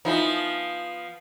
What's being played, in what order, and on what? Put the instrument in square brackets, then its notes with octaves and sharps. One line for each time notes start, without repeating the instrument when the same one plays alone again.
[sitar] F3 B3 [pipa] D#4 E4 G#4